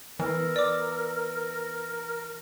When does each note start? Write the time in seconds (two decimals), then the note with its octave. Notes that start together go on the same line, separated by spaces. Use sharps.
0.19 E3 B3 A#4 B4 E6
0.56 D5 D6